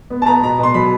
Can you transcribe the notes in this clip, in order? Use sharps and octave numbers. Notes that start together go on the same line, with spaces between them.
B3
A5
B3 A#5
B2 A#5
B2 C6
F#3 B5